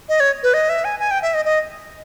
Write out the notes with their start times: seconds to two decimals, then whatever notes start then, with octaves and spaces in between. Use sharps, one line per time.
0.09 D#5
0.20 C#5
0.43 B4
0.54 D#5
0.69 E5
0.85 G#5
0.99 G#5
1.11 G5
1.22 E5
1.34 D#5
1.45 D#5